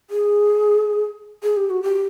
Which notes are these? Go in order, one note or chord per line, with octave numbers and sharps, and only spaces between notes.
G#4
G#4
G4
F#4
G4